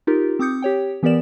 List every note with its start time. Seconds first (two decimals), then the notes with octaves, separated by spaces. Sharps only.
0.07 D#4 F4 G4 A#4
0.39 C4 D6 D#6 G6 C#7
0.62 G4 C#5 G5
1.03 E3 B3 G4 A#4 D5 E7